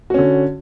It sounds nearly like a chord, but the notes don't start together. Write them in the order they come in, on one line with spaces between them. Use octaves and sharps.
F#4 C#4 D3